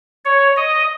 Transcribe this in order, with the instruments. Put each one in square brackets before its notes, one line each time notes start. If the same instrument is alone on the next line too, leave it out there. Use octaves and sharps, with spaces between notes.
[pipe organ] C#5
D#5